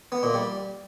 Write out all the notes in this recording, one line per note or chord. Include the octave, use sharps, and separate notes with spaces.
B3
A#2
G3